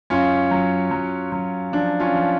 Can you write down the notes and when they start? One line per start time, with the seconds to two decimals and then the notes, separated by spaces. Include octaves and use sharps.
0.10 F#2 C#4 F4
0.51 F#3
0.91 F#3
1.32 F#3
1.72 F3 D4
2.00 C#4 F4
2.14 F3